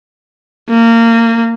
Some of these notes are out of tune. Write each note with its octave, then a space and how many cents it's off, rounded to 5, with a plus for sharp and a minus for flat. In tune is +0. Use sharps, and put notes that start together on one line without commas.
A#3 -25